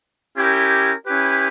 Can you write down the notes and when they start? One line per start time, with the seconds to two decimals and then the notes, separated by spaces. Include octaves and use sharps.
0.36 C#4 E4 G4 A#4
1.07 C#4 E4 G4 B4